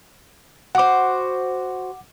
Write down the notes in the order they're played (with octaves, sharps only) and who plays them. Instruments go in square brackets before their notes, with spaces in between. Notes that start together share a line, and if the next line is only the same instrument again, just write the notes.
[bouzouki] F#4 C5 [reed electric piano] F#5 D6